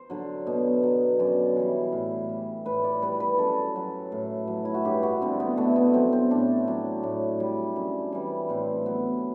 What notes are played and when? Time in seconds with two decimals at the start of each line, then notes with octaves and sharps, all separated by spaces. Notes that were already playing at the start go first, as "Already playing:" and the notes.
Already playing: C5
0.10 D3 F#3
0.47 B2
0.83 F#3
1.19 F#2 D5
1.56 E3 G3
1.92 A2
2.29 G3
2.65 A2 B4
2.84 D5
3.02 G3 B4
3.20 B4
3.38 F#2 A4
3.76 F#3
4.12 A2
4.48 F#3
4.65 E4
4.74 F#4
4.85 G2 G4
5.03 F#4
5.21 D3 G3 C4
5.40 B3
5.57 B2 A3
5.76 B3
5.94 F#3 C4
6.12 C4
6.30 A2 D4
6.68 F#3
7.03 A2
7.40 G3
7.76 F#2
8.12 E3 G3
8.49 A2 C4
8.86 F#3 B3